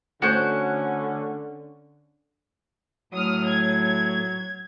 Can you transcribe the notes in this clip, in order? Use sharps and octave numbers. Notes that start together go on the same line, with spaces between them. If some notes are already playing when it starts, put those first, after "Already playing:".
D3 A3 C#4 F#4 C5 G#5 F#6 G6
A2 F#3 D#6 F6
G#6